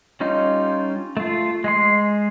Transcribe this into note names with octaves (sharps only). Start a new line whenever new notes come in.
G3 C#4 D#4 F4
A3 F4
G#3 G#4 C6